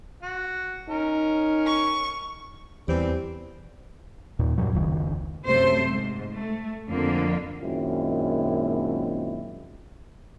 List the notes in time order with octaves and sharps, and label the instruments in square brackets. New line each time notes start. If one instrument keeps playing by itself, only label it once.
[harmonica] F#4
[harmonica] C#4 A#4 [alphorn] D#4
[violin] C#6
[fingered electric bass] E2 [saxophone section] E3 G3 C4
[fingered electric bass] D#2 A#2
F#2 A#2 F#3
F1 C#2 D#3
[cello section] F#2 C3 A3 C5
G#2
A3
F2 D3 A#3
[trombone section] F#2 A#2 D#3 G#3 C4 E4